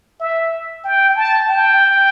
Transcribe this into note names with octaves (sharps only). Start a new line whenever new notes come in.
E5
G5
A5
G5